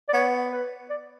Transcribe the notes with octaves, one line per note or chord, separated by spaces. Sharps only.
D5
B3 C#5
B4
D5